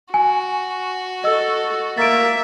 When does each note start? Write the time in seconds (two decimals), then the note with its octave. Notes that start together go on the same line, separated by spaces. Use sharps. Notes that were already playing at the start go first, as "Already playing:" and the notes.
0.14 F#4 G#5
1.24 A4 D#5 E6
1.98 A#3 E5 A6 D7